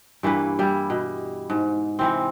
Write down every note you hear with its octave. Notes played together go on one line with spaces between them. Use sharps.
G2 E3 A#3 B4
G3 E4
B2
G#2
C3 E3 C4